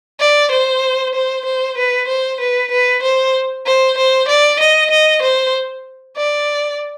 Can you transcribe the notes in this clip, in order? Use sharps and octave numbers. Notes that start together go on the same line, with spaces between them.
D5
C5
C5
C5
B4
C5
B4
B4
C5
C5
C5
D5
D#5
D#5
C5
D5